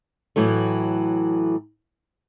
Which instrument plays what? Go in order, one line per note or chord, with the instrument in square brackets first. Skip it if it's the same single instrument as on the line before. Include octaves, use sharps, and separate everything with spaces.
[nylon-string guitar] A2 E3 F#3 A3